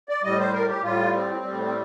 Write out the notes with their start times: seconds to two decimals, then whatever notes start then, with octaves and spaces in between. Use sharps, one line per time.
0.09 D5
0.23 A2 G3 D#5
0.39 C5
0.53 A#4
0.68 G4
0.83 A2 G3 F4
1.14 C4
1.43 A2 G3
1.63 C4